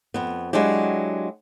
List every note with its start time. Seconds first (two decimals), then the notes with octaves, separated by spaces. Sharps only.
0.14 F2 B3
0.53 F#3 G#3 D4 E4 G4